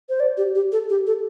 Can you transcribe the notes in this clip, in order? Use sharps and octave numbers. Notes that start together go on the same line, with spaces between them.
C5
D5
G4
G4
A4
G4
A4